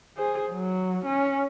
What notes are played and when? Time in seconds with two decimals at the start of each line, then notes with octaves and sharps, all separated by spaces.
0.17 G#4 C5
0.51 F#3
1.05 C#4